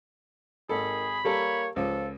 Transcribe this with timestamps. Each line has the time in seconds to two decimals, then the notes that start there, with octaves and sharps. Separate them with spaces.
0.69 G#1 D#3 G#4 A4 B5
1.25 G3 A#3 A4 A#4 C#5
1.76 C#2 F3 A4